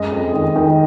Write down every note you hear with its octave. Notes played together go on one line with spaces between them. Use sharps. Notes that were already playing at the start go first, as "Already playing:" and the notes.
Already playing: F#2 G#3 D#5
F2
D#3
D#3